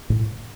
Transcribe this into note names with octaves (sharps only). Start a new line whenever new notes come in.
A2